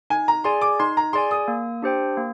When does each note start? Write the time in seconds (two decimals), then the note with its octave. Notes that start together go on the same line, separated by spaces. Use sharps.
0.10 D#4 G#5
0.28 A#5
0.44 G#4 D5 G#5 C6
0.61 D6
0.79 D#4 C6
0.97 A#5
1.13 G#4 D5 G#5 C6
1.31 D#6
1.48 A#3
1.82 D4 G4 C5 G5
2.17 A#3